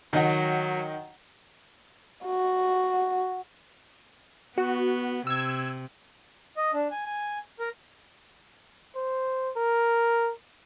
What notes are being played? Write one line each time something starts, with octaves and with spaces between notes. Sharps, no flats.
D#3 F#3 D#5 F#5
F#4
B3 F#4
C3 E6 G#6
D#5
D4
G#5
G#5
A#4
C5
A#4